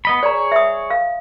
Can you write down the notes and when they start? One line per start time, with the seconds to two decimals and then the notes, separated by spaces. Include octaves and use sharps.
0.05 B3 D#5 B5
0.23 G#4 C#5 D5 A#5
0.52 E5 D#6
0.90 F5